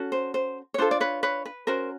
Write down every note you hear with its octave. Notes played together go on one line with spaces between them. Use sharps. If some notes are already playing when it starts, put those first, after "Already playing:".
Already playing: C#4 F#4 A4
C5
C5
C#5
D4 F4 A4 C5
D5
B4 C#5
B4 C#5
B4
C#4 F#4 A#4 C5